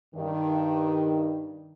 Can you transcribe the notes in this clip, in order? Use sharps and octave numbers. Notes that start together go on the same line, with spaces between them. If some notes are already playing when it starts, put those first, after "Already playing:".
G2 D#3